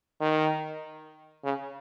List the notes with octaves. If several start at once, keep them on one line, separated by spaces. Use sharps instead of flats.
D#3
C#3